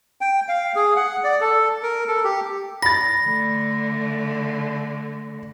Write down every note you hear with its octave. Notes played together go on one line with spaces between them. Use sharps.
G5
F5
G#4
F#5
D5
A4
A#4
A4
G4
B5 A6 A#6
D3 A3